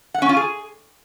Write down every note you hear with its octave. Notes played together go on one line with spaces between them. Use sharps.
F#5
C#4
F4
G#4